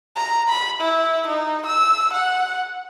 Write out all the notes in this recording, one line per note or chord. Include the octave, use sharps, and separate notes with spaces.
A#5
B5
E4
D#4
E6
F#5